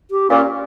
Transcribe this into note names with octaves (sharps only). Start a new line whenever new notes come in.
G4
A#2 C#4